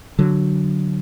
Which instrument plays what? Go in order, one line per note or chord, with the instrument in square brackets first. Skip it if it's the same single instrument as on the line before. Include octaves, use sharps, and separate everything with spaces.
[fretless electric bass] D3 F#3